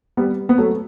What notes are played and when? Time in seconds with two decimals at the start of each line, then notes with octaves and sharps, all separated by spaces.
0.17 G3 B3
0.49 B3
0.58 F#3 A3